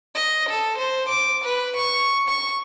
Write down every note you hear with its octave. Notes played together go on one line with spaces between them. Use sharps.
D#5
A4
C5
D6
B4
C#6
C#6